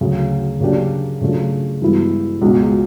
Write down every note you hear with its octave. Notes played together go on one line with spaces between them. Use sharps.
D2 C#3 F#3
C#3 F#3 A#3 D4 G4
C#3 F#3 A3 D4 F4
G2 E3 G#3 B3 E4
C#2 B2 G#3